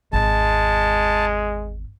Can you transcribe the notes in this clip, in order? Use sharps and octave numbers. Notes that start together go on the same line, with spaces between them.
G#1 E2 G#3 A5